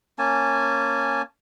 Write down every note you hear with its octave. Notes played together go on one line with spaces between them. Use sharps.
A#3 C#4 G#5 A5